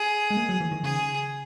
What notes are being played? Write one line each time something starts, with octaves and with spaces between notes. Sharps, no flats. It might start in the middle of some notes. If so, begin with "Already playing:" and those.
Already playing: G#4
G#3
A#3
F#3
E3
D#3
C#3 G#4